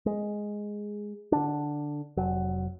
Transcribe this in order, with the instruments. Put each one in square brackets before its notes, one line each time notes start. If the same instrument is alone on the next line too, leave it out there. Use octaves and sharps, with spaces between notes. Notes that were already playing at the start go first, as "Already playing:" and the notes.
[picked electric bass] G#3
D3 D4
F1 F#3